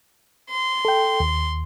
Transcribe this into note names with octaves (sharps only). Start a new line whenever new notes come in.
C6
A4 G5
D#2